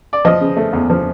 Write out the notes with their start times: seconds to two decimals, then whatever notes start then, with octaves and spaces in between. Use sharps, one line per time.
0.13 D5
0.25 F3 D#5
0.41 C#3
0.57 A3
0.73 E2
0.90 F3